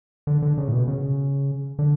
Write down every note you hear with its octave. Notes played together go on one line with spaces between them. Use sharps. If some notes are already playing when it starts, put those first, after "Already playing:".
D3
D3
C#3
A2
B2
C#3
D3